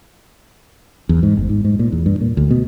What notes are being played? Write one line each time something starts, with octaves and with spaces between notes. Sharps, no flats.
E2
G#2
G1
G#2
G#2
A#2
E2
G2
A#2
D2
B2